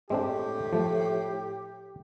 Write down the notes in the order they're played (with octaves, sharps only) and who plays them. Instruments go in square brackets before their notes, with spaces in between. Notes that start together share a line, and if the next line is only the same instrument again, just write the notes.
[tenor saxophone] A2 [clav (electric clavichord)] G#3 C4 D4 [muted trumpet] G4
[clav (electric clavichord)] F3 A3